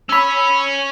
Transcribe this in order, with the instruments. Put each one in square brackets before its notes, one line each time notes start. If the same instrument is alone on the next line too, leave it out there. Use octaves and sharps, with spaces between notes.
[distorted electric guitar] C#4 C#5 [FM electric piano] B5 E6